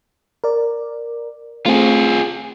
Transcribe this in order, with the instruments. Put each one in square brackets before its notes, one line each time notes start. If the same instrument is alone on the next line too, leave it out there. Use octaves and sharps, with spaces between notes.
[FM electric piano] A#4 D5
[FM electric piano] A3 C4 [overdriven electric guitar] F4 G#4